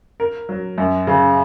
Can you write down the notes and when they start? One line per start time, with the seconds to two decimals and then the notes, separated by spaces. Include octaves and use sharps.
0.20 A#4
0.49 F#3
0.78 F#2
1.07 C#3